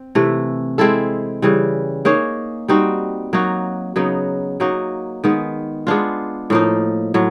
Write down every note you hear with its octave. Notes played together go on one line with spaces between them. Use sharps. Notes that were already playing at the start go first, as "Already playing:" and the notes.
Already playing: C4
C3 E3 A3
G#3 C4 E4 A4
C#3 E3 G3
A#3 D#4 G#4 C#5
G3 C4 D#4 F#4
F#3 A#3 D#4 F#4
C#3 F#3 B3 D#4
F#3 A#3 D#4 F#4
D#3 G#3 B3
G#3 B3 D4 F4
A2 F3 A#3 D#4
A2 F#3